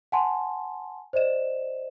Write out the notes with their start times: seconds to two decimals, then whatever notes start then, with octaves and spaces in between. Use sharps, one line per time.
0.12 F#5 G#5 A5 C6
1.13 C5 D5 D#5 E7